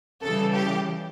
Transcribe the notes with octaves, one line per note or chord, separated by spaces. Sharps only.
C#3 E3 G3 A4
G4